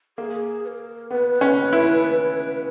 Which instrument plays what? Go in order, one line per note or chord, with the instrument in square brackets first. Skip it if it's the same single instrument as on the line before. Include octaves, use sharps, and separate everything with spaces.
[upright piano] A#3 [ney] G#4
[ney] B4
A#4
[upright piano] B3 [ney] B4
[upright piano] C#4
E4